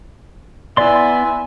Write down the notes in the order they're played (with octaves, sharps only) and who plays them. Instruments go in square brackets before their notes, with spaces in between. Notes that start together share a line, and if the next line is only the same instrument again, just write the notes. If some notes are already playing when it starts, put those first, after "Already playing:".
[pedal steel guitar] B3 D5 C6 [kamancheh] E4 G#5